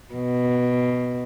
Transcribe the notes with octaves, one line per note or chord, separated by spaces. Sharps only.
B2